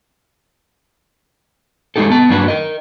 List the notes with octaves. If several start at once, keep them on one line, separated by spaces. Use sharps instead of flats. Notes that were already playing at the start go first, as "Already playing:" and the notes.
G#3 A3 D#4 G4 A4
B3 A5
G2 F#3 A#3 D4 F#4 B4
A#4 D#5